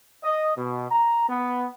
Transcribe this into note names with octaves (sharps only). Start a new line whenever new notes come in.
D#5
B2
A#5
B3